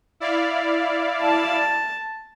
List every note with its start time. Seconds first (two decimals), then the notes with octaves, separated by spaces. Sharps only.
0.20 E4 D5 F5
1.22 A5